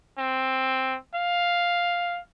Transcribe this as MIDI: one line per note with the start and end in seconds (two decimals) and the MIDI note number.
0.18 0.97 60
1.15 2.20 77